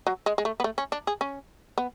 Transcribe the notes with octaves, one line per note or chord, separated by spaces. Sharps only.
F#3
G#3
G#3
A3
B3
A3
C#4
D4
G#4
C#4
B3